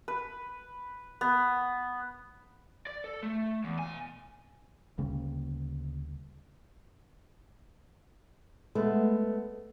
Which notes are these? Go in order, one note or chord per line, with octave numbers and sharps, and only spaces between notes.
B4
B3
D5
A4
A3
E2
B2 G#5
D2 C#3 G3 A#3
G#3 A3 B3